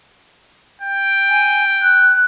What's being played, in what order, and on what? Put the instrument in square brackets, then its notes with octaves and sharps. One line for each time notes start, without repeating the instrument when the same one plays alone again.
[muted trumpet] G5
[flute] G#5
F#6